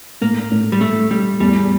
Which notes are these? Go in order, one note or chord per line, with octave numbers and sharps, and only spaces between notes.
A2 A#3
A2
G3
A2 A3
A2 G3
E2 G3